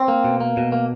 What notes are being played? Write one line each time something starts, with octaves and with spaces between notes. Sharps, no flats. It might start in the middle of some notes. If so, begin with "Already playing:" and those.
Already playing: C4
A#3
B2
A#3
B2
A#3